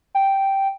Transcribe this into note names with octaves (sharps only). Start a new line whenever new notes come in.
G5